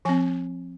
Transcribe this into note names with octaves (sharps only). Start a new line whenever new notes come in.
F3 C4 G#5